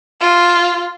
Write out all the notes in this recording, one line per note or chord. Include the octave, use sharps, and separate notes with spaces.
F4